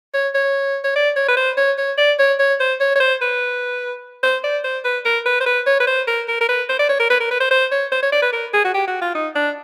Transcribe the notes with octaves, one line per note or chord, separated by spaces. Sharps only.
C#5
C#5
C#5
D5
C#5
B4
C5
C#5
C#5
D5
C#5
C#5
C5
C#5
C#5
C5
B4
C5
D5
C5
B4
A#4
B4
C5
B4
C#5
B4
C5
A#4
A#4
A#4
B4
C5
D5
C#5
A#4
B4
A#4
B4
C5
C5
C#5
C5
C#5
D5
B4
A#4
G#4
F#4
G4
F#4
F4
D#4
D4